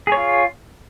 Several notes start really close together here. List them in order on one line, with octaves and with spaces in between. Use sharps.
G#4 C#5 F4